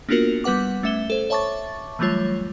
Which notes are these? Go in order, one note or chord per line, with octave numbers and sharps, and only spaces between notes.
A#3 B3 D4 F4 F#4 A#4
G3 B3 B4 F#5 D6
A3 C#4 E5 E7 G7
A4 C5
C#5 E5 A5 C#6 D6 A6
E3 F#3 G3 A3 F4 C#5